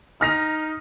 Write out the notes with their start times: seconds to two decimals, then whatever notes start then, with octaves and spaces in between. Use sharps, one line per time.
0.21 D#4 F6 A#6 F7